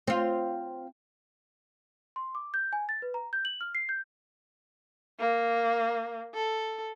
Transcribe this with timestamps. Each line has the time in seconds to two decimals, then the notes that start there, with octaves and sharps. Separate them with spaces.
0.07 C4 F4
2.16 C6
2.35 D6
2.54 G6
2.73 G#5
2.89 A6
3.02 B4
3.14 A#5
3.33 G6
3.45 F#7
3.61 F6
3.75 C7
3.89 G6
5.19 A#3
6.34 A4